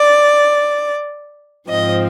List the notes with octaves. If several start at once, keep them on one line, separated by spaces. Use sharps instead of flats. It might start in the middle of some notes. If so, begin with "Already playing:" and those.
Already playing: D5
G#2 F3 C4 D#5